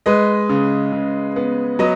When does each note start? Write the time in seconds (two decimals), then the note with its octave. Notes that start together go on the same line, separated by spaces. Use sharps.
0.06 G#3 B4 D#5
0.49 C#3
0.92 C#3
1.36 B3
1.79 F#3 B4 D#5